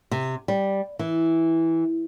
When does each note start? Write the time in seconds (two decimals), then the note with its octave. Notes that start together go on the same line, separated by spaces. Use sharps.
0.11 C3
0.48 G3
0.99 E3